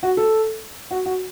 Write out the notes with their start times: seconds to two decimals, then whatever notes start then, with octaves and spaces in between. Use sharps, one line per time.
0.03 F#4
0.17 A4
0.91 F#4
1.06 F#4